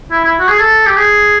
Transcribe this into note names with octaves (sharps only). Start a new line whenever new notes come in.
E4
E4
F#4
G#4
A4
G4
G#4